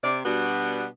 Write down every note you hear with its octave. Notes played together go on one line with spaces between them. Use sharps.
C3 D5
B2 G3 B3 D4 F#4